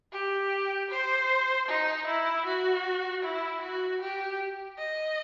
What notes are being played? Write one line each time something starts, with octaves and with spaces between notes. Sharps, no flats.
G4
C5
D#4
E4
F#4
E4
F#4
G4
D#5